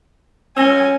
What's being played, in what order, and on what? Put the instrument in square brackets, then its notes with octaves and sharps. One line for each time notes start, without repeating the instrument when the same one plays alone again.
[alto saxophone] C#4 [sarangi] G#5 [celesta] E6 A#6 G7